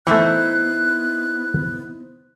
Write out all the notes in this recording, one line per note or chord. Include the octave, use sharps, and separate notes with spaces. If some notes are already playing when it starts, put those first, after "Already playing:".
E3 A3 B3 D#4 E4 C5 F#6